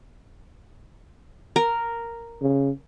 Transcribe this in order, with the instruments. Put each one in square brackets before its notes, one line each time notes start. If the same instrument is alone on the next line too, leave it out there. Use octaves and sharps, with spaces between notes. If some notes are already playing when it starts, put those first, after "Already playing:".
[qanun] A#4
[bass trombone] C#3